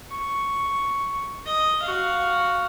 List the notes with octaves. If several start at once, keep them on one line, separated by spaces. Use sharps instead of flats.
C#6
D#5
F#4 F5